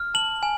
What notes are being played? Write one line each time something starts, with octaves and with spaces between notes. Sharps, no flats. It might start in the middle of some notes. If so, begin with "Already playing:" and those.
Already playing: F6
A5 F#7
G#5